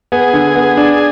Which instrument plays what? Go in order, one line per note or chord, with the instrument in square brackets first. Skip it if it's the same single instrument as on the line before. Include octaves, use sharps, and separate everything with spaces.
[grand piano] B3 [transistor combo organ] G#4
[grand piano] D3
B3
D4